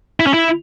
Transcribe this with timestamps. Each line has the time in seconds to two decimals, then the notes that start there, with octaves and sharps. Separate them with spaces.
0.20 E4
0.27 C#4
0.34 E4